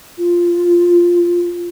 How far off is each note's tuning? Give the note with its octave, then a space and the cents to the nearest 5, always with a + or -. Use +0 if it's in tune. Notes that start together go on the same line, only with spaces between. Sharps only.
F4 -5